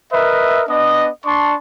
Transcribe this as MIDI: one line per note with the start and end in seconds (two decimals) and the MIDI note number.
0.13 0.64 70
0.13 0.64 71
0.13 0.64 75
0.13 0.64 76
0.69 1.09 59
0.69 1.09 62
0.69 1.09 75
1.26 1.55 62
1.26 1.55 74
1.26 1.55 81
1.26 1.55 84
1.26 1.55 85